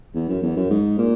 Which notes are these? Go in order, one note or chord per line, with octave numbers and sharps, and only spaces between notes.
E2
F#2
E2
F#2
G#2
A#2